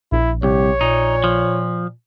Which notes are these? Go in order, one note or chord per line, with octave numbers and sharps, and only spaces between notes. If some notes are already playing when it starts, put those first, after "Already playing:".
A#1 E4
C2 G4 C#5
A#2 D#4
F3